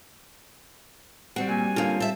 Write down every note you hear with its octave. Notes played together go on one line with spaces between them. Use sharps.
F#3 G3 C4 F#4 F#5
A#2 G#5
D3 A#3 F4 C#5 F5
A4 E5